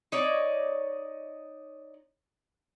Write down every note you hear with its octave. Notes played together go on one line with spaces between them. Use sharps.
D#4 C#5 D5